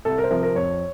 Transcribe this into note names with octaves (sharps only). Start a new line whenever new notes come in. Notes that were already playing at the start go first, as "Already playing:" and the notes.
C2 A4
A#4
C5
C3 F3 A#4
A#4
F2 C#5